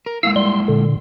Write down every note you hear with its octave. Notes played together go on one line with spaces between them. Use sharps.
A#4
G#3 A#3 E4 F5 E6
G3 C6
A#2 D3